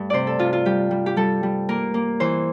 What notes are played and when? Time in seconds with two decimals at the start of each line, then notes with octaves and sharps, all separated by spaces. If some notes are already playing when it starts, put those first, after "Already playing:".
Already playing: G2 A3
0.10 C3 C5 D5
0.27 A4
0.39 C3 F4
0.53 F4
0.65 G3 G4
0.91 G3
1.06 G4
1.16 G3 A4
1.43 G3
1.69 A#3 A#4
1.94 A#3
2.20 E3 C5